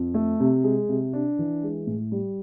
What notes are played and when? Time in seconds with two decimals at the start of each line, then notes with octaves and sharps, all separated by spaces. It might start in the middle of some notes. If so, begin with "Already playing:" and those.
Already playing: F2
0.14 A3
0.40 C3
0.64 G#3
0.89 C3
1.13 D4
1.39 E3
1.63 G#3
1.87 A2
2.12 G3